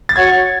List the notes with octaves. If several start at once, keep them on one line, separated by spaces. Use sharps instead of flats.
A6
F#4 C#5 F#5 C#6 G#6